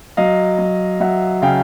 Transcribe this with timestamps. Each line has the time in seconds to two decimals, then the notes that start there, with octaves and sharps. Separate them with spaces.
0.17 F#3 D#5 F5
0.58 F#3
1.00 F#3 E5 F#5
1.42 C#3 F5 G5